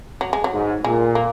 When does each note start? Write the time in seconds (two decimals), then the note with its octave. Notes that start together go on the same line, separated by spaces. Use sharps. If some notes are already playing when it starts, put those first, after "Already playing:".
0.21 F#3
0.33 G#3
0.44 F#3
0.52 G#2
0.84 A#2 G#3
1.15 A#3